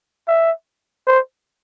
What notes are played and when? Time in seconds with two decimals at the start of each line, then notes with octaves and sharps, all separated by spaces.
0.28 E5
1.07 C5